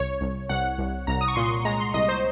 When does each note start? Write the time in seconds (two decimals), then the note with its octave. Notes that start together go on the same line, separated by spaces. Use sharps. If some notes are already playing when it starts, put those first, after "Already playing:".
Already playing: C2 C#5
0.21 C2
0.49 C2 F#5
0.78 C2
1.07 C2 A#5
1.21 D#6
1.28 C#6
1.36 A#2 C6
1.65 G#3 A#5
1.80 C6
1.94 C2 D#5
2.08 C5